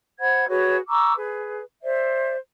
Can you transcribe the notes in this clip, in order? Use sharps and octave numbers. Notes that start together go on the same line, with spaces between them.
C5 F#5 B5 G#6
F#4 G#4 B4 C#5
A#5 C#6 D6 E6
G#4 B4
C5 D5 E5